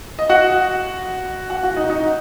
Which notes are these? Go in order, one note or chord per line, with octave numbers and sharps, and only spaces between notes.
D#5
F#4 F#5
F#4 F#5
F#4 F#5
D#4 D#5
D#4 D#5